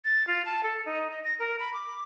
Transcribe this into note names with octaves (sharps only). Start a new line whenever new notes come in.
A6
F4
A5
A4
D#4
D#5
A#6
A#4
B5
D6